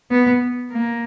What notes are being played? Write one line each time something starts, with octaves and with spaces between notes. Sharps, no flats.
B3
A#3